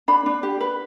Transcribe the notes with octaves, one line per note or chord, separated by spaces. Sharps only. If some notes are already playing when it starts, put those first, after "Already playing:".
D4 B5
D4
G4
B4